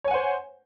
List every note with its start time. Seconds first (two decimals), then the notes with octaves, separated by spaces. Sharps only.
0.04 C#5
0.08 G#5
0.11 F#5
0.14 C5